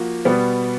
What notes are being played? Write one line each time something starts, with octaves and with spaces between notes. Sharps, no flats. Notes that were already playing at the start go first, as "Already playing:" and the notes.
Already playing: F3 A#3 F#4
B2 G3 B3